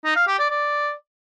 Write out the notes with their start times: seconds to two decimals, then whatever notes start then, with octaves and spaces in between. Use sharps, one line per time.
0.05 D#4
0.16 F5
0.28 G4
0.39 D5
0.50 D5